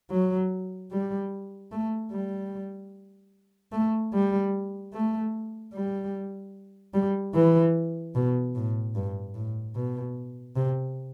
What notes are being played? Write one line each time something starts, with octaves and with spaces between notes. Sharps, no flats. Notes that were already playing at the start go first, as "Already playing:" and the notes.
F#3
G3
A3
G3
A3
G3
A3
G3
G3
E3
B2
A2
G2
A2
B2
C3